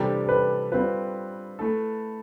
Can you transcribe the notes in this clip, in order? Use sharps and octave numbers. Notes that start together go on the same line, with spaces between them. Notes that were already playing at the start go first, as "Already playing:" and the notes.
Already playing: C3 E3 G3 D4 G4 A4
A4
B4
G3 C4 F4 B4
A3 E4 A4